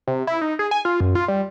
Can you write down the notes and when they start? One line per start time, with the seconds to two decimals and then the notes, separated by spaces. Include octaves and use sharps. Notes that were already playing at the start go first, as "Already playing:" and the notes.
0.07 C3
0.27 E4
0.41 D#4
0.59 G#4
0.71 G#5
0.85 F4
1.00 F#2
1.15 F4
1.28 G3